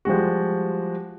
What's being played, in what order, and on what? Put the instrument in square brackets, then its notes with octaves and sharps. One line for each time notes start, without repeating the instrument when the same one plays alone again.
[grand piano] F3 G3 G#3 F#4